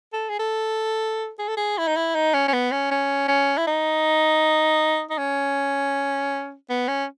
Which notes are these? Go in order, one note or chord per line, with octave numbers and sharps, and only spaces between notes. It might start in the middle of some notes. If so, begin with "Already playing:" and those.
A4
G#4
A4
G#4
A4
G#4
E4
D#4
E4
D#4
C#4
C#4
B3
C#4
C#4
C#4
E4
D#4
D#4
C#4
B3
C#4